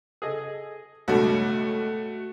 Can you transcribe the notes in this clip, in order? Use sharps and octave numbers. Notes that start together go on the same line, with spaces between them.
G#4 A4 D#5
C#2 G2 B2 A3 F#4